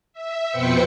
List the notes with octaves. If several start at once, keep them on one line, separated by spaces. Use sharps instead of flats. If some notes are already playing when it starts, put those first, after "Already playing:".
E5
F2 B2 B4 C5 G5 C#7